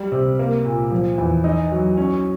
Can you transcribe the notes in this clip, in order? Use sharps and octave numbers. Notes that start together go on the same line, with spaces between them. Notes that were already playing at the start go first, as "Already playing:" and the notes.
Already playing: G3
C3
A#3
A#2
F3
E2
D#4
F#3
C#4